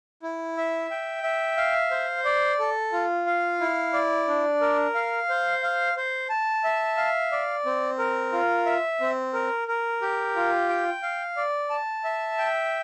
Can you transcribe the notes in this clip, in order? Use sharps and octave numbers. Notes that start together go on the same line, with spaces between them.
E4
E5
G5
E5
F5
C5
D5
A4
F4
F5
E4
D5
D4
A#4
F5
C5
F5
C5
A5
E5
F5
D5
C4
A#4
F4
E5
C4
A#4
A#4
G4
F4
G5
F5
D5
A5
E5
G5